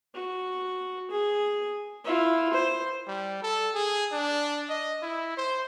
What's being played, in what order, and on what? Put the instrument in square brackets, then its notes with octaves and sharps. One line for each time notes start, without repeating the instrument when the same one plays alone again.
[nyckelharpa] F#4
G#4
E4 F4
C5
[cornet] G3
A4
G#4
D4
D#5
E4
C5